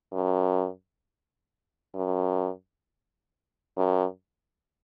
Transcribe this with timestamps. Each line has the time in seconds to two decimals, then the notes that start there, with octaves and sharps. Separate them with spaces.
0.13 F#2
1.95 F#2
3.77 F#2